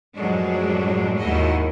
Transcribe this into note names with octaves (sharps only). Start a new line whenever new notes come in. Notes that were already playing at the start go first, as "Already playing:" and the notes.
F#2 A2 F3 F#3 G#3 D4
D#2 G#2 D#3 E4 F#4 D#5